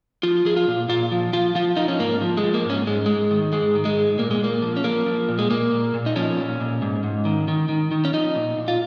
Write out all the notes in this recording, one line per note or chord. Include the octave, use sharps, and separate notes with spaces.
F3 F4
F3 G#4
F4
A#2
A#2 F4
F3
F3 F4
F3 F4
F3 D#4
C#4
G#2 A#3
F3
G#3
F3
A#3
G#2 C#4
G#2 G#3
G#2 G#3
D#3
G#2 G#3
D#3
G#3
G#2
A#2 A#3
G#3
A#2 A#3
F3
C#4
F3 A#3
F3
A#2
G#3
A#2 A#3
A#2
A#2
D#4
F3 C#4
A#2
A#2
G#2
G#2
D#3
D#3
D#3
D#3
C#4
F3 D#4
A#2
A#2
F4